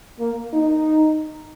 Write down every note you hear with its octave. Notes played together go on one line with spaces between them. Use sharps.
A#3
D#4